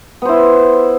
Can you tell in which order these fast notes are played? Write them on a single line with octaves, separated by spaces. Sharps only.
B3 C5 E4